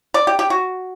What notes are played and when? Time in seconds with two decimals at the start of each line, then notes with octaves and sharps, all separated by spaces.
0.14 D5
0.27 G4
0.39 G4
0.50 F#4